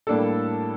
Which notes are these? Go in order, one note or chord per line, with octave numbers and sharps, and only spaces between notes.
A2 G3 A#3 D4 A4